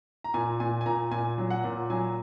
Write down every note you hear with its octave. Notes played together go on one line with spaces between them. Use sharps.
A#5
A#2 G#5
A#2 G#5
G#5
A#2 A#5
A#2 G#5
F#3
F#5
A#2
F#3 G#5